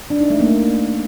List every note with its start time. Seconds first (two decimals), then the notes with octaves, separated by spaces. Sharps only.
0.10 D4
0.20 D#4
0.30 A3
0.40 A#3